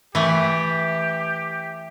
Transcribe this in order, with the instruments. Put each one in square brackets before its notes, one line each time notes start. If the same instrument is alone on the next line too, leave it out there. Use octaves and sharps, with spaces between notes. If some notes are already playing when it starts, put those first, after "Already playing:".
[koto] E3 A3 [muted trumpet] G4